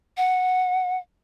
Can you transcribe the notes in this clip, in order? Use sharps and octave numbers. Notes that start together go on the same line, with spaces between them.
F#5